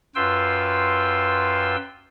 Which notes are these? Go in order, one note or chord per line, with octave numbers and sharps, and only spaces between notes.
F#2 F4 B4 G5 C6 E6